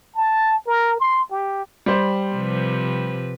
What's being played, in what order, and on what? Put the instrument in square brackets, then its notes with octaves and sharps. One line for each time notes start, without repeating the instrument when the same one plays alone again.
[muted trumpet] A5
A#4
C6
G4
[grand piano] G3 C5
[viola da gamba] C3 F3 B4